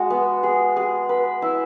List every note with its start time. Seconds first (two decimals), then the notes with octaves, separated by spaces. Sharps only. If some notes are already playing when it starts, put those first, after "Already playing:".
Already playing: G#3 F#4
0.10 B3
0.43 G#4
0.76 G#4
1.09 B4
1.42 E4